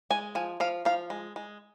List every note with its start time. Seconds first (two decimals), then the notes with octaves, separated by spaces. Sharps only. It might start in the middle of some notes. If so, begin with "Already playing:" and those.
0.10 G#3 G#5
0.35 F3 G#5
0.60 F3 F5
0.85 F3 F5
1.10 G#3
1.36 G#3